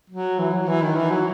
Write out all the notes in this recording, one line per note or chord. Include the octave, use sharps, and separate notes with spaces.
F#3
E3
F#3
E3
D#3
E3
F#3